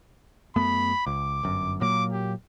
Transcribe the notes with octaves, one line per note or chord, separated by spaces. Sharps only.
F#2 A3 B3 B5
C#2 D6
G1 F#2
A#2 F#3 A#3 D6
G4